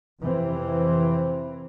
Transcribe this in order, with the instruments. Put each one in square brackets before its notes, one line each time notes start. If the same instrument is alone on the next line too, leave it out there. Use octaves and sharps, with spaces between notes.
[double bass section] F2 C3 E3 C4